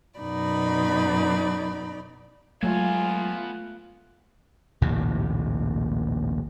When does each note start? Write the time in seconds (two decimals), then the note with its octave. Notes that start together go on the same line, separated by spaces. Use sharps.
0.19 F#2 B2 D#4 D5 B5
2.63 F#3 G#3 A3 B3 F4 G#5
4.81 A#1 D#2 A2 C3